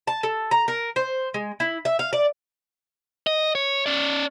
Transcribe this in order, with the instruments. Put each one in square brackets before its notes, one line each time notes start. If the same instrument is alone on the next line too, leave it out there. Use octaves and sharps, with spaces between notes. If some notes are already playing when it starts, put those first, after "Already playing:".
[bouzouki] A5
A4
A#5
A#4
C5
G#3
E4
E5
F5
D5
[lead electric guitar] D#5
C#5
C#4 D5